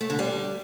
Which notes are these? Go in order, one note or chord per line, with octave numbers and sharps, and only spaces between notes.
A3
D3
G3